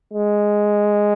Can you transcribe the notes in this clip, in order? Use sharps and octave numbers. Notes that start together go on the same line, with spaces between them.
G#3